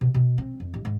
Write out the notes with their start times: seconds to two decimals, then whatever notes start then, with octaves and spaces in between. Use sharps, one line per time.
0.01 B2
0.14 B2
0.38 C4
0.60 F2
0.74 A1
0.85 G#2